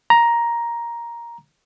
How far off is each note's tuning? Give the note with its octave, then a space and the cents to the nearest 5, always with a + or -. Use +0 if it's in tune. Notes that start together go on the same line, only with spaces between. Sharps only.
A#5 +10